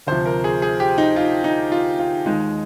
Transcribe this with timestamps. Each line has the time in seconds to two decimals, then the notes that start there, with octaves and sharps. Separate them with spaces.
0.07 D2 C3 F3 C5
0.26 A#4
0.44 G#4
0.62 G#4
0.80 G4
0.98 D#4
1.16 F4
1.44 D#4
1.72 F4
1.99 F4
2.26 D#2 D#3 G#3 D#4